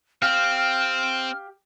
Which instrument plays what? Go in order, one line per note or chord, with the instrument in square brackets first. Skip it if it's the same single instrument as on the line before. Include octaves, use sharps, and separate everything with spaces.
[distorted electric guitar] C4 [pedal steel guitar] G4 F5 [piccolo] F6